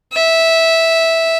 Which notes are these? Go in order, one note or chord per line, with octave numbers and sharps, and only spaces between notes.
E5